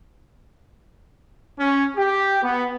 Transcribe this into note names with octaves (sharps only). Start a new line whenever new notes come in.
C#4
G4
B3